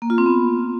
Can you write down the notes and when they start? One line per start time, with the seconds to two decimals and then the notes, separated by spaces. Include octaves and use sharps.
0.02 A#3
0.10 F4
0.18 C4
0.26 B3